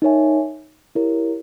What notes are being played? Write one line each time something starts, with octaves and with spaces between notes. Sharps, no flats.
D#4 A#4 C#5 E5 G#5
E4 G4 A#4 C#5